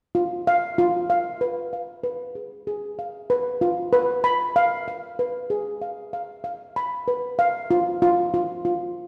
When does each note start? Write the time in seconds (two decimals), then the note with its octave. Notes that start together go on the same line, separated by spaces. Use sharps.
0.15 F4
0.47 F5
0.78 F4
1.10 F5
1.41 B4
1.73 F5
2.04 B4
2.35 G#4
2.67 G#4
2.99 F5
3.30 B4
3.61 F4
3.93 B4
4.24 B5
4.56 F5
4.88 F5
5.19 B4
5.50 G#4
5.82 F5
6.13 F5
6.44 F5
6.76 B5
7.08 B4
7.39 F5
7.71 F4
8.02 F4
8.34 F4
8.65 F4